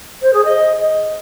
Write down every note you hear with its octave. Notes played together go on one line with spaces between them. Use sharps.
C5
G#4
D#5